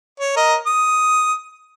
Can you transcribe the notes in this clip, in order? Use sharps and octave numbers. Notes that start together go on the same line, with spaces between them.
C#5
A#4 D#5
D#6